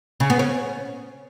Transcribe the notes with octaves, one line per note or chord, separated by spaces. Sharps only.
C#3
B3
C#4